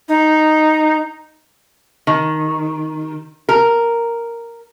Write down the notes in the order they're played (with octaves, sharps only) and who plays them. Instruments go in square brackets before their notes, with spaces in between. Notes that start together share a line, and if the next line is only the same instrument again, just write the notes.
[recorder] D#4
[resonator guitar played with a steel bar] D#3
A#4